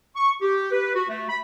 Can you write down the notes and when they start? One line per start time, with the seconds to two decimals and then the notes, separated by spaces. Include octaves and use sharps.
0.15 C#6
0.41 G4
0.72 B4
0.95 F#4
1.08 A3
1.29 B5